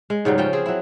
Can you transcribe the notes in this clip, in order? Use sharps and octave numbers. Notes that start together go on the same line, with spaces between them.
G#3
G#2 C#3 F#3 G3
F3 C#4 G5
C4 G#4
F#3 E4